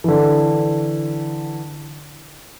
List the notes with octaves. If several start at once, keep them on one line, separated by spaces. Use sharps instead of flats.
D3 E3